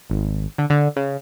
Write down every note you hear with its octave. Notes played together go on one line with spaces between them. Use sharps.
G#1
D3
D3
C#3